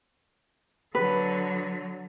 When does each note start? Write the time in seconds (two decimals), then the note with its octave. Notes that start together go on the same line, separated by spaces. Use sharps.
0.95 D3 F#3 B4